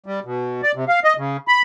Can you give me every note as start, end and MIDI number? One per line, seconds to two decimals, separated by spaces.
0.06 0.20 55
0.25 0.61 47
0.63 0.72 74
0.75 0.85 48
0.88 1.00 77
1.04 1.13 75
1.18 1.37 49
1.48 1.62 83